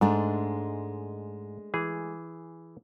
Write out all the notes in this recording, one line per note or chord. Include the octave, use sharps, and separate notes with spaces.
G#2 G#3 A3 D4
E3 G#4